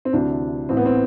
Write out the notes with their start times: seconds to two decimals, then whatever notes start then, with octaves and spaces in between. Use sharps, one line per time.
0.05 C4
0.13 D2 C3 E3 D4
0.69 A1 A2 E3 C4
0.77 B3
0.86 C4